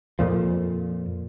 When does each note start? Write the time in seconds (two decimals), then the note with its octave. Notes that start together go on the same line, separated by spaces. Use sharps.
0.19 F2 A#2 F3